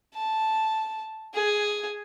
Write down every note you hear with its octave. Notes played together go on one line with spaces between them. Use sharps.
A5
G#4